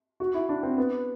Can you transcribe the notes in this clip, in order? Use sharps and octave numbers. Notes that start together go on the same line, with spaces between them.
F#4
E4
D4
C4
B3